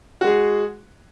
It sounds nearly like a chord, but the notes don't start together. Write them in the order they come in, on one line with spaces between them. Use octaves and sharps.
F#4 G#3 G#4